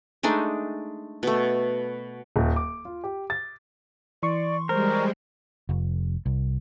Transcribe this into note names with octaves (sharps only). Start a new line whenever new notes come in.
G#3 A3 D4 D#4
B2 A3
D#1
D6
F4
G4
A6
E3 D5 C6 C#6
G3 G#3 A#4 C5
F1
C2